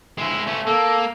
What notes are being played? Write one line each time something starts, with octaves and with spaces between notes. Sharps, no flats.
G#3 E4
A3 C#4
A#3 A4